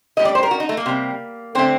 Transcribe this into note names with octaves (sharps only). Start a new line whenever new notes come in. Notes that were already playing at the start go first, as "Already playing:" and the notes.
A2 G3 D#5
D5
C5
A#4
F#4
D#4
A3
A#3
C3 G3
D3 A3 C4